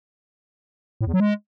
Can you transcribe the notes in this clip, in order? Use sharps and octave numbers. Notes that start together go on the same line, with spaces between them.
A2
E2
F#3
G#3